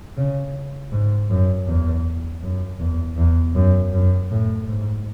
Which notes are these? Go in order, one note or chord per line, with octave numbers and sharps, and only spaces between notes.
C#3
G#2
F#2
E2
F#2
E2
E2
F#2
F#2
A2
G#2